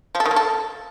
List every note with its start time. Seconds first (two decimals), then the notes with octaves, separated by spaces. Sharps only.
0.15 F3
0.20 A4
0.26 D#3
0.31 A#3
0.36 A4